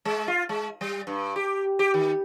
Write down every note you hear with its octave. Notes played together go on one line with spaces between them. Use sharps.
G#3
F4
G#3
G3
G2
G4
G4
D#3